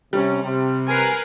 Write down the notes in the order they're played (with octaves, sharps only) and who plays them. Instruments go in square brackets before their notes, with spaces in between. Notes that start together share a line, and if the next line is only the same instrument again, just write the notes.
[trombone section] C3 C#4 [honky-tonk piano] G3
[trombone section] C3
[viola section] A#4 B4 [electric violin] G#5 C7